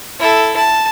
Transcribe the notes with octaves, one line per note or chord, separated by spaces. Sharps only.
E4 A4
A5